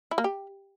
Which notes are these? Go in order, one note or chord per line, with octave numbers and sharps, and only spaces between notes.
E4
A#3
G4